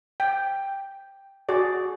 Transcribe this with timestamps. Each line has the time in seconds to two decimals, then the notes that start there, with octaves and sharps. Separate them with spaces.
0.20 G5
1.49 F#4 G#4 D5